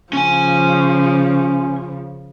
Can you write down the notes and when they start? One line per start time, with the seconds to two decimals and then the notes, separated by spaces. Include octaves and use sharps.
0.13 C#3 F3 C#4 G#5